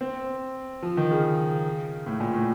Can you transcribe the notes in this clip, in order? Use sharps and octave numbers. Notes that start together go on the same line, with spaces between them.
C4
F3
D#3
C#3
A2
A#2
A2